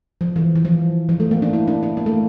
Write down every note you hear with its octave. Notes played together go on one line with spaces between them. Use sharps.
F3
E3
E3
F3
F3
A3
A#3
D4
E4
D4
D4
A#3
A3